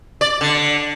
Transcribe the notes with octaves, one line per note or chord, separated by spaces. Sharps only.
D5
D3